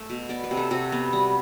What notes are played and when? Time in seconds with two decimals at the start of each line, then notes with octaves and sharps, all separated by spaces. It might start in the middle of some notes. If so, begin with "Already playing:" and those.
Already playing: A3 E5
0.10 B2
0.29 B3 D5
0.44 B4
0.51 C3
0.57 A4
0.71 C3 F#4
0.92 B3
1.13 G3